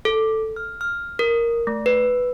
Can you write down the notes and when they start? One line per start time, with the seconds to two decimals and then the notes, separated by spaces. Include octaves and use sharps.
0.05 A4
0.56 F6
0.81 F6
1.19 A#4
1.67 A3
1.86 B4